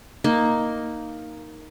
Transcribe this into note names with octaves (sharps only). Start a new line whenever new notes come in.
A#3 D#4 D#5